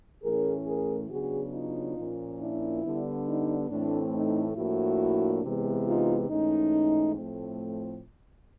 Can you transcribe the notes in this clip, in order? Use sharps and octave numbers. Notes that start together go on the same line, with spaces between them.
A2 E3 A3 C#4 G#4 A#4
G#4 A#4
C#3 F#3 B3 D4 F#4 G#4
D#4 F4
A#2 F3 A#3 C#4
D4 E4
D3 G3 B3 D4
D#4
A2 E3 A3 C4 D4
D#4
A2 F3 A#3 D4 E4 F#4
C3 E3 G#3 B3
D#4 F4
G#2 E3 A3 C#4 D#4
A2 F3 A3 C4